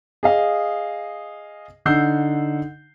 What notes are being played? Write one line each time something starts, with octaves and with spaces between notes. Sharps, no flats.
G#4 D#5 F5
D3 D#4 F#5 E6 G6 C7